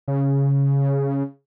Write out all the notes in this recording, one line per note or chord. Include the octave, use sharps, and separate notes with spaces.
C#3